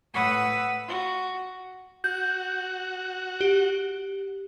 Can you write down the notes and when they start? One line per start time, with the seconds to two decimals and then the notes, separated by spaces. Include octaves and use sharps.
0.14 A2 B4 F#5 B5 D#6 E6
0.88 F#4
2.04 F#4 G6
3.41 G4